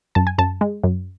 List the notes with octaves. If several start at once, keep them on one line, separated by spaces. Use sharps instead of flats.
F#2 A5
G#5
F#2 A5
G#3
F#2